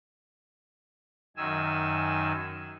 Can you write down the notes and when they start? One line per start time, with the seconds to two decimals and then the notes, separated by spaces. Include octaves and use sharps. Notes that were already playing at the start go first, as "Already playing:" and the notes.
1.37 F#2 D#3 G#5 E6